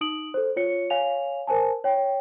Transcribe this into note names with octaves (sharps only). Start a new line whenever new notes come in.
D#4 D#6 D7 F#7
A4 C5
F4 C#5 C#7
C#5 F5 G#5 F7
A#4 C5 G#5 A5
C#5 G5